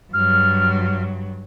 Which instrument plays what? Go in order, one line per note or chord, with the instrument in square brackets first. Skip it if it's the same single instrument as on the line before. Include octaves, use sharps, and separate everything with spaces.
[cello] G2 F#3 [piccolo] F6